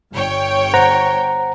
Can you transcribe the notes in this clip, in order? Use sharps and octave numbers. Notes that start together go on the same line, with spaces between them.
G1 C#5 G5
C5 F#5 A#5